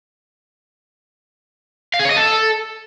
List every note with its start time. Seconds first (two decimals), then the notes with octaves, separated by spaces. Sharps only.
1.94 F5
1.99 G#4
2.05 C#5
2.11 D#5
2.16 A4